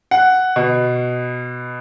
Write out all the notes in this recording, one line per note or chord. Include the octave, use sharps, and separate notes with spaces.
F#5
B2